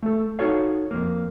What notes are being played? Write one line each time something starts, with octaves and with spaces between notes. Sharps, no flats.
A3 A4
D#4 F#4 A4 C#5 F5
F2 A#3